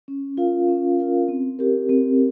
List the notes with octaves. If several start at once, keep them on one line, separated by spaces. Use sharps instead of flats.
C#4
F4 A#4 F5
C#4
F4 A#4 F5
C4
G4 A#4
C4